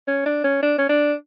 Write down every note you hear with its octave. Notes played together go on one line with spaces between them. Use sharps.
C#4
D4
C#4
D4
C#4
D4